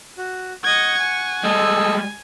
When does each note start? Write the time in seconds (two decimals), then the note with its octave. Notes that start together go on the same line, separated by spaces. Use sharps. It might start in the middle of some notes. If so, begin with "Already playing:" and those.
0.18 F#4
0.63 D#5 F#5 C#6 G#6
1.00 G#5
1.44 G3 G#3 A4 D#5 E6